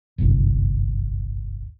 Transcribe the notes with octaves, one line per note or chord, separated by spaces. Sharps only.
D1 G1 C2 F#2